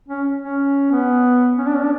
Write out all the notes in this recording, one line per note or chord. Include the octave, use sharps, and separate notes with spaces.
C#4
C#4
B3
C#4
D4
C#4
D4